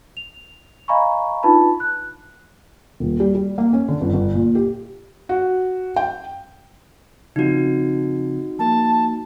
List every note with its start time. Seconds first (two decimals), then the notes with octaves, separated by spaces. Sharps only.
0.17 F7
0.88 D#5 F5 G#5 A#5 B5 C#6
1.43 D4 D#4 F4 B4 A5 B5
1.80 F#6
3.00 D#1
3.20 G3
3.35 G3
3.58 A#3
3.73 C#4
3.88 D3
4.01 G1
4.13 G1
4.34 A#2
4.55 G4
5.29 F#4
5.96 G5
7.36 C#3 F3 C4 D#4 F#4
8.59 F3 A#3 A5